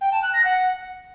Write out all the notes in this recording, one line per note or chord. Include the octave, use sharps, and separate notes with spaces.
G5
A5
F#6
A#6
F#5